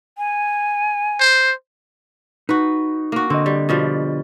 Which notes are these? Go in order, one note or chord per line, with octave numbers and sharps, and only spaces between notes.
G#5
C5
D#4 F#4 B4
A#3 F#4
D3 C4 D#5
G3
B2 F3 G3